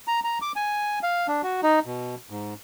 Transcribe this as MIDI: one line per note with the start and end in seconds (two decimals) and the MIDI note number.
0.08 0.20 82
0.24 0.38 82
0.42 0.52 86
0.56 0.99 80
1.03 1.27 77
1.28 1.42 62
1.43 1.61 66
1.63 1.79 63
1.86 2.15 47
2.30 2.54 44